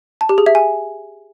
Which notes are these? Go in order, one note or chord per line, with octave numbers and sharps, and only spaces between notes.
A5
G4
G#4
E5
G#5